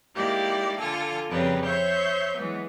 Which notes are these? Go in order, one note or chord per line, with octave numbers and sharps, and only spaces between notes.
G#3 A#3 D#4 E4 G4 D5
D3 F4 A4 G#5 F6
F2 C#3 G3 C4 A#4 B4
C5 C#5 E5 C#6 G6
E3 F#3 G#3 B3